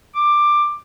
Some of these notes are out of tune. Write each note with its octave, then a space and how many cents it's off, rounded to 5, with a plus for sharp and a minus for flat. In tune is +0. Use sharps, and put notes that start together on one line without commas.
D6 +15